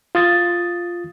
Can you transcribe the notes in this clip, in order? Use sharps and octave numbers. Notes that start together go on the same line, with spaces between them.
F4 D#6 A6